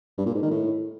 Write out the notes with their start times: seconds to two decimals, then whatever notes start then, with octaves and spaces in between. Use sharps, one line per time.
0.18 G2
0.26 A#2
0.34 G#2
0.43 D#3
0.51 A2